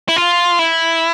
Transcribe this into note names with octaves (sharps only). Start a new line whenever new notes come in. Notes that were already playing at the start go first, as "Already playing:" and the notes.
E4
F4
E4